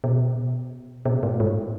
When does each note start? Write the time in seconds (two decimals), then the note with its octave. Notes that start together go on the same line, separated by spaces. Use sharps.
0.04 B2
1.05 B2
1.23 A2
1.40 G#2